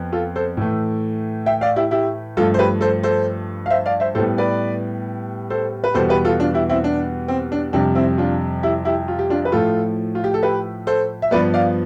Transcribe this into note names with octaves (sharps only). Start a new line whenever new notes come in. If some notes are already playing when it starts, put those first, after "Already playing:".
Already playing: F2 F3 B3
F4 A4
A4 C5
A2 E3 A3
E5 G5
D5 F5
E4 G4
E4 G4
G2 F3 A3 F4 A4
C5
G4 B4
A4 C5
A4 C5
F5
C5 E5
D5 F5
C5 E5
A2 G3 B3 A4 C5
B4 D5
A4 C5
B4
E2 B2 G3 B3 A4 C5
G4 B4
F4 A4
D4 F4
E4 G4
C4 E4
D4
C4
D4
F2 C3 G3 D4
C4 E4
D4 F4
E4 G4
E4 G4
F4
G4
D4 F4
B4
A2 F3 A3 F4 A4
F4
G4
A4
G4 B4
A4 C5
E5
G2 F3 B3 B4 D5
D5 F5